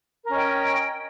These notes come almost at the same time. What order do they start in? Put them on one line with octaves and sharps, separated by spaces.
A#4 C#4 D#5 G5